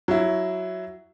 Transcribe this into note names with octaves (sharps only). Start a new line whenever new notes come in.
F#3 E4